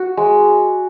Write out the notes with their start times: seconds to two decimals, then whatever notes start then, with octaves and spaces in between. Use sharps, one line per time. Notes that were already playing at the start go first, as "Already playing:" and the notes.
Already playing: F#4
0.17 G#3